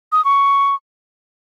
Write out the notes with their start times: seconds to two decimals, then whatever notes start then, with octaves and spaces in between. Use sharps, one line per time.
0.12 D#6
0.25 C#6